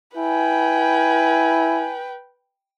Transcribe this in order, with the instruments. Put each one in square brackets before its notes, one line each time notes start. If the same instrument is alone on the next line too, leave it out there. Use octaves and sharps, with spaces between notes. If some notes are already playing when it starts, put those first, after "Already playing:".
[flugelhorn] E4 [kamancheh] B4 G5 [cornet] G#5